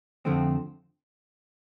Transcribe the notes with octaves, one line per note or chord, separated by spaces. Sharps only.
F2 D3 F3 A3 C4